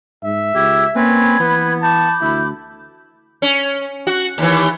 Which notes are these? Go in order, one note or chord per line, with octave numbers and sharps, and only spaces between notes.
G#2 E5
C#2 G4 C#6 E6 G#6
A#3 C4 C#4 B4 B5 G#6
E3 B3 B4
A5 B5 D6 G6
D2 E4
C#4
F#4
D#2 E3